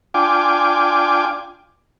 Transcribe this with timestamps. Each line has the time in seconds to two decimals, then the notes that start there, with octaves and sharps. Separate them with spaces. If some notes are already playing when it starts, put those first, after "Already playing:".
0.14 D4 F4 G5 G#5 D6